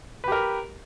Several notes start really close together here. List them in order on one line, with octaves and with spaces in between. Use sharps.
B4 G4 A#4